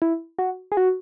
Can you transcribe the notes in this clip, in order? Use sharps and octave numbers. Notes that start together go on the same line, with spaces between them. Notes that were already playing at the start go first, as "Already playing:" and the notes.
E4
F#4
G#4
F#4